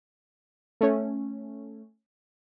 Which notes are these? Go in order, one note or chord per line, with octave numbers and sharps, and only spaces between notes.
A3 C#4